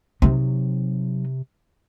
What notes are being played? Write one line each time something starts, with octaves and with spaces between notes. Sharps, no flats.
C3 F#3 D#4